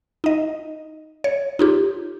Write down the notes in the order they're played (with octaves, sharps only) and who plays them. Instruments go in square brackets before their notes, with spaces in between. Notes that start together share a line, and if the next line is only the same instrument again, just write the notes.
[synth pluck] D#4 D#5
C#5
D#4 F4 G4